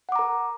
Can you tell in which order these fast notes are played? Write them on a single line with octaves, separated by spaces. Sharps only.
F#5 D6 A#5 A#4